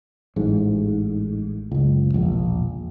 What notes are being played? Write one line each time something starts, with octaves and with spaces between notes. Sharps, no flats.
A1 G#2
F#1 C#2
E1 A#1